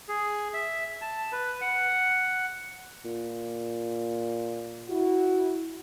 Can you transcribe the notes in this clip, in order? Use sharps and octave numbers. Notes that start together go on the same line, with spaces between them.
G#4
E5
A5
B4
F#5
A#2
E4 F#4